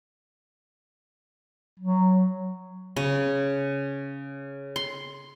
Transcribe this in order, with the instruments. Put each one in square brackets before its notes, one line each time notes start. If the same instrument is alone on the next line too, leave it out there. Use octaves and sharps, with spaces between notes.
[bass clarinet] F#3
[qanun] C#3
C6